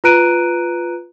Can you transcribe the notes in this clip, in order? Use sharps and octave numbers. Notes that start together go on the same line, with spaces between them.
F4 B4 A#5 F#6 D7 D#7